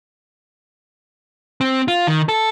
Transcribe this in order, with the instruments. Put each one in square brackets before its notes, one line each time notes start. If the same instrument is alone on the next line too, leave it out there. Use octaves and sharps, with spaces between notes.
[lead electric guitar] C4
F4
D#3
A4